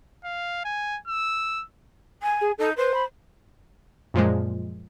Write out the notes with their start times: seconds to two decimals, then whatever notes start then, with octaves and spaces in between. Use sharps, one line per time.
0.24 F5
0.65 G#5
1.08 E6
2.22 G#5
2.41 G#4
2.58 D#4 A4
2.77 B4 C5
2.94 B5
4.14 F#2 A#2 F3 G#3